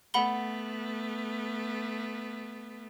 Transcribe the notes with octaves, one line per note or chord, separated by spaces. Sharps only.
A3 B3 F#5 B5 G7